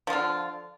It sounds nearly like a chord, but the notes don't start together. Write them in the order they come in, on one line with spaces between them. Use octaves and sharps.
F3 F4 D3